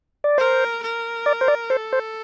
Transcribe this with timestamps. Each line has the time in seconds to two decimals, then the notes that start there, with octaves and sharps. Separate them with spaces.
0.24 D5
0.38 A#4 C5
0.82 A#4
1.26 D5
1.41 C5
1.48 D5
1.70 A4 C5
1.93 C5